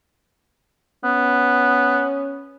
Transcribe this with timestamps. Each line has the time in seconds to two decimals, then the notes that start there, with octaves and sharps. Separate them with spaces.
1.04 B3 C#4